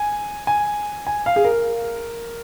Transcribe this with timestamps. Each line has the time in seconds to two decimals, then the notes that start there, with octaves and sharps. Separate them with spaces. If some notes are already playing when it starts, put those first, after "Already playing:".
Already playing: G#5
0.47 G#5
1.07 G#5
1.26 F5
1.36 G#4
1.45 A#4